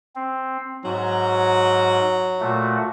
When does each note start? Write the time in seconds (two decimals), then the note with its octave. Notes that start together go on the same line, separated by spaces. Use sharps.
0.16 C4
0.85 G#2 F#3
2.41 A#2 A3 F#4